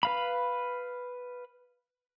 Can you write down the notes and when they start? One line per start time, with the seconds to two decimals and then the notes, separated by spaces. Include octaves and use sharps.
0.03 B4 F5 B5